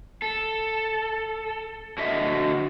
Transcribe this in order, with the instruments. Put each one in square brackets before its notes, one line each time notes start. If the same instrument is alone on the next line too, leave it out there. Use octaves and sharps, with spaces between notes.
[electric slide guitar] A4
D3 F#4 D#5 E5